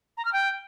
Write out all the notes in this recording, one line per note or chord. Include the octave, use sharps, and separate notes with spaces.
A#5
F6
G5